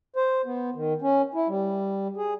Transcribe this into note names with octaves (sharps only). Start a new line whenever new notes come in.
C5
B3
D#3
C#4
E4
G3
G#4